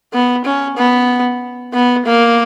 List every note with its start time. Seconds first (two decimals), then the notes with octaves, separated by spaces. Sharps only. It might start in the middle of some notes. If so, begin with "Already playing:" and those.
0.13 B3
0.45 C#4
0.77 B3
1.74 B3
2.06 A#3